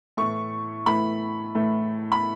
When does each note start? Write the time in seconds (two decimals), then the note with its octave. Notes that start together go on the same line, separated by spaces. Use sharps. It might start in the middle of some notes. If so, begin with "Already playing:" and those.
0.17 A2 E3 A3 C#6
0.86 A2 E3 A3 B5
1.55 A2 E3 A3
2.12 B5